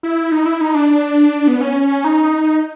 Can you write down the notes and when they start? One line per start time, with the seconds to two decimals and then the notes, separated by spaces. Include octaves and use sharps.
0.03 E4
0.32 D#4
0.46 E4
0.61 D#4
0.75 D4
1.48 B3
1.61 C#4
2.04 D#4